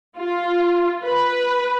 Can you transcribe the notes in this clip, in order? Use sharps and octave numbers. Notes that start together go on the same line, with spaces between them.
F4
B4